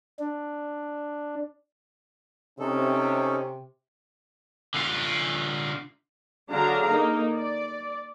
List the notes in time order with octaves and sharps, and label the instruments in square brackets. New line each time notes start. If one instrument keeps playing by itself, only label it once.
[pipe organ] D4
[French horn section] C3 [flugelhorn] C#4 [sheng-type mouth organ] D#4 A4
[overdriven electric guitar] D3 F4
[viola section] D3 F#3 D4 G#4 F5 A#5
A#3 D#4
D5